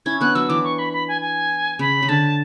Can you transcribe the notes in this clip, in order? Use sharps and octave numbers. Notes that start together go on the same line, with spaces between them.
C#4 E4 G#6
B3 D4 F#6
F#3 E6
E3 D6
C#6
B5
B5
G#5
G#5
C#3 B5
C#3
D3 A5